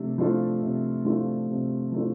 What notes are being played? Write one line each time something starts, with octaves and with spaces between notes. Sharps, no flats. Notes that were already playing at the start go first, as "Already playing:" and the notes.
Already playing: C3 F3 A3 D4
F3 A3 D4 F4
C3
F3 A3 D4 F4
C3
F3 A3 D4 F4